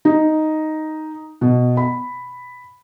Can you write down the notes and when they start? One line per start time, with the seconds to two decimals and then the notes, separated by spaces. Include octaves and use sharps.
0.05 D#4
1.41 B2
1.77 B5